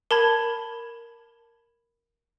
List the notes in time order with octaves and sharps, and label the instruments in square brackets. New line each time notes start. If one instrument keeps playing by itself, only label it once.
[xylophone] A#4 A5 B5 G#6